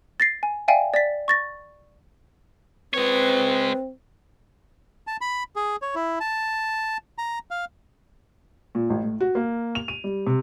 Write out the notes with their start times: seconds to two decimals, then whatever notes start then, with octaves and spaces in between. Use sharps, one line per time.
0.20 A6 A#6 C7
0.43 G#5
0.68 D5 E5 F5 G5 G#5
0.94 D5 A6 B6
1.28 C#6 A6 A#6
2.94 G#3 C4 B4 C#5
5.07 A5
5.21 B5
5.56 G#4
5.82 C#5
5.95 E4
6.20 A5
7.18 A#5
7.51 F5
8.75 A#2
8.90 A1
9.04 A2
9.21 F#4
9.35 A#3
9.75 F7
9.88 D#7
10.04 G3
10.27 C3